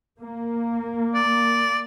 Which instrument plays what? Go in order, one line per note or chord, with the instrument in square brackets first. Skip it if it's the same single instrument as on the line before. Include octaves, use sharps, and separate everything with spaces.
[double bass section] A#3
[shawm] D5